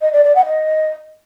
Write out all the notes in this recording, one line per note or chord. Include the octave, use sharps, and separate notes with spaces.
D#5
D5
D5
F#5
D#5